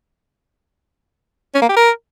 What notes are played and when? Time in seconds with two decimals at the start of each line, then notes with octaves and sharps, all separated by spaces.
1.55 C#4
1.62 A#3
1.69 G4
1.76 A#4